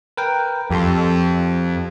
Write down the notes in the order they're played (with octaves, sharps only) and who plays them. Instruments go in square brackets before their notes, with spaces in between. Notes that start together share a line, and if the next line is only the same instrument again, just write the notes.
[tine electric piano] A#4 B4 G5
[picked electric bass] F2 [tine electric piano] G4 A4 C6